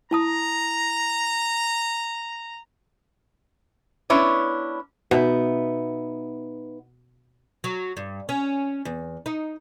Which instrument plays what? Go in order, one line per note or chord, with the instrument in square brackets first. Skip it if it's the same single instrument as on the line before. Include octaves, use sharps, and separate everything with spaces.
[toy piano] E4 A5 D#6 [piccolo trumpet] A#5
[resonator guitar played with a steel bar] B3 C#4 D4 E4 B4 C#5
[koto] B2 [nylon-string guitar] B3 D#4 E5
[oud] F#3
G2
C#4
E2
D#4